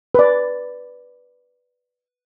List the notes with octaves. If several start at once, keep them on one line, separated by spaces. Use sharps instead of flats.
B4 D5